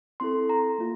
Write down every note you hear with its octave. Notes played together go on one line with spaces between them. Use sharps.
C4 E4 A4 C6
A#5
A#3 F4